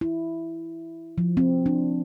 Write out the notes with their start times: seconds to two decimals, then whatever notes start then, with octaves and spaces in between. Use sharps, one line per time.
0.01 E4
1.18 F3
1.37 C4
1.66 D4